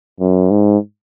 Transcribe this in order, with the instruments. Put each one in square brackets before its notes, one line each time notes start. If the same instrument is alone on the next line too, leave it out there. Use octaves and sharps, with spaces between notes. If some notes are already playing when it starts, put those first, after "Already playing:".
[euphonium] F#2
G#2